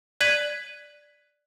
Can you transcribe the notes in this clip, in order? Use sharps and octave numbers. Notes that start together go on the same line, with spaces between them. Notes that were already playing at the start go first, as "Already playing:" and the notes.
D5 F#6 G#6 B6 D#7 F#7